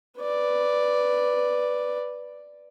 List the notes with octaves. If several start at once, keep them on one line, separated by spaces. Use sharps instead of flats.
B4 D5